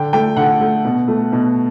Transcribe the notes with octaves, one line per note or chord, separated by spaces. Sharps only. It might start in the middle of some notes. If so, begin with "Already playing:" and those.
Already playing: D3 G5
A3 G5
D3 F#5
A3
B2
A3
B2